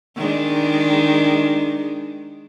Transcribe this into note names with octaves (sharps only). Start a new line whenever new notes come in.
D#3 G#3 D4